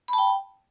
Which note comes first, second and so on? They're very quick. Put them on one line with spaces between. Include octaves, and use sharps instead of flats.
B5 A5 G5